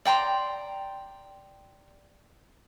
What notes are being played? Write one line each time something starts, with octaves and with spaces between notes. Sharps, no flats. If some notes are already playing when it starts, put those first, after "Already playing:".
D5 G5 A#5 C6